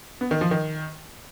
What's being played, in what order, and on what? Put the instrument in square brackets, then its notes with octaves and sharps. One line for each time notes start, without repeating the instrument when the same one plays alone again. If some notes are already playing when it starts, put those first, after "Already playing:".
[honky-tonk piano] B3
D#3
F3
D#3